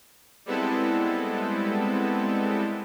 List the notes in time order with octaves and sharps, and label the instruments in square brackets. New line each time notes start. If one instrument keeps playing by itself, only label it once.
[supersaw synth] G3 G#3 B3 C4 E4 A4